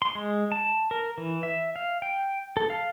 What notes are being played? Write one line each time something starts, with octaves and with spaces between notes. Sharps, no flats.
C6
G#3
A5
A#4
E3
E5
F5
G5
A4
F5